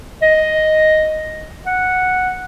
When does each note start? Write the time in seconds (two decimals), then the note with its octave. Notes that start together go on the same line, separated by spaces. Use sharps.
0.22 D#5
1.66 F#5